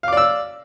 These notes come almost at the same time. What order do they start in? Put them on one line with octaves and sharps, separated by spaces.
F5 D6 D5 E6